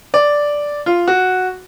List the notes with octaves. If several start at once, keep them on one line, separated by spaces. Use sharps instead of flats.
D5
F4
F#4